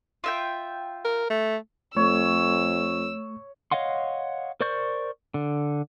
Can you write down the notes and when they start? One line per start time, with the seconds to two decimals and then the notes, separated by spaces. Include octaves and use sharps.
0.24 F4 E5 G5
1.05 A#4
1.30 A3
1.97 F2 A3 C#5 E6
3.71 C#5 D#5 F5 F#5 C6
4.61 A#4 C5 D5 C#6 G6
5.34 D3